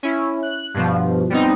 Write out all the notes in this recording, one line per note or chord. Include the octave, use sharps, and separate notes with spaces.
C#4 E4
F#6
G2 B2 F3
G3 B3 C4 D#4